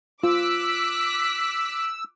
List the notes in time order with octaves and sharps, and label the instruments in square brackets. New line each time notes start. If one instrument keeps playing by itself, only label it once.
[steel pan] F4 [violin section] D6 F#6 B6 [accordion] E6